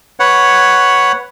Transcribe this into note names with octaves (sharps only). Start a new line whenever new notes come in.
B4 C#5 F#5